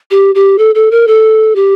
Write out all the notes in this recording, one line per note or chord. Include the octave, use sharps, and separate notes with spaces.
G4
G4
A4
A4
A#4
A4
G4